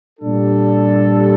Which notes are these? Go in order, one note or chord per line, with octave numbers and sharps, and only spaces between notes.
A#2 G3 D4 A4